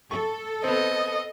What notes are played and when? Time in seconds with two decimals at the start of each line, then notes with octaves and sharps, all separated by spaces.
0.11 A4 C#6
0.64 B3 C4 D#5